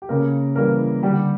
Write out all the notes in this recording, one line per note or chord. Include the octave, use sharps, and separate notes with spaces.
G4
C#3 A#3 A#4
E3 G3 A#3 A#4
D3 G3 G4